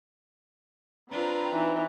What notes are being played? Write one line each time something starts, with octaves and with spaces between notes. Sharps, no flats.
C4 D4 F4 B4 A#5
E3 D#4